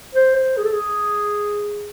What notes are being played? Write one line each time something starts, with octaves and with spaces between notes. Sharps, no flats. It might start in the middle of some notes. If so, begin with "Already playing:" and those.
C5
C5
G#4
A4
G#4